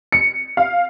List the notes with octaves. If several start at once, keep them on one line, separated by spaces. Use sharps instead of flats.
C#7
F5